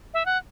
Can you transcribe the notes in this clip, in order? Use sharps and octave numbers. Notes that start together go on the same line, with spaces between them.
E5
F#5